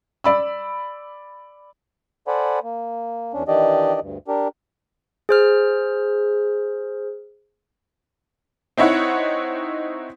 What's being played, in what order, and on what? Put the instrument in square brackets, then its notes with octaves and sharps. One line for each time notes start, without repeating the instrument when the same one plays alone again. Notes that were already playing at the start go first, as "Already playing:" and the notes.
[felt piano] D5 B5 E6
[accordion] A4 C5 D5 F#5 G#5 B5
A#3
E2 C#4 D4
D#3 E3 D4 G4 D5 D#5
D2 G2
D4 G4 A#4
[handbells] G#4 C5 F6
[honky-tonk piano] C4 D#4 E4 C#5 F#5